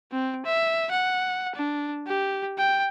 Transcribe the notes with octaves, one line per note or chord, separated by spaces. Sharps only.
C4
E5
F#5
D4
G4
G5